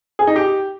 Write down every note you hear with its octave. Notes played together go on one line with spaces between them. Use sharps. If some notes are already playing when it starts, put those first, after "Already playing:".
G#4
D#4
G4